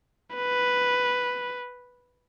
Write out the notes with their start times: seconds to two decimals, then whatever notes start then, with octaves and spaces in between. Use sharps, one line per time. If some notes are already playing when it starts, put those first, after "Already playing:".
0.36 B4